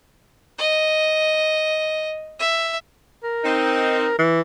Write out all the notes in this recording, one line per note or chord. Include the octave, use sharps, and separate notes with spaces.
D#5
E5
A#4
C4 D#4
E3